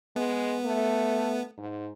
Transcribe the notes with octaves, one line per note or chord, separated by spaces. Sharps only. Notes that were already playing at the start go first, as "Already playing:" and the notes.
G#3 B3
A3
G#2